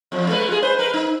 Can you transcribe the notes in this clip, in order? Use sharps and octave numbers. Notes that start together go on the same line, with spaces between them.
E2 F3
G#3 A#3 B4
F4 G#4
B4 C5
A#4 B4
D#4